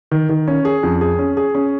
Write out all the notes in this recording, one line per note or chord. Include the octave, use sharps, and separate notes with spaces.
D#3
D#3
C#4
G#4
F2
G#4
C#4
G#4
C#4